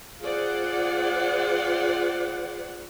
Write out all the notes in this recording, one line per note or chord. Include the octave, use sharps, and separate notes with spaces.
F4 G#4 C5 D5 F#5